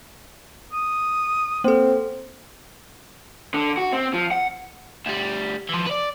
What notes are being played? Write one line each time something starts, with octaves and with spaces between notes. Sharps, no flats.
D#6
A#3 C4 A4
D3
F#4
C4
F3
F#5
D2 G3
E3 F3
B4 D5